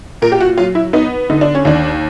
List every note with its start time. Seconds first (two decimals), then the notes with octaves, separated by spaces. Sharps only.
0.22 A#2 A#4
0.32 G4
0.40 F#4
0.58 F#3 F4
0.75 E4
0.93 B3 D#4
1.30 D3 D#4
1.41 D4
1.55 C#4
1.65 D#2 D4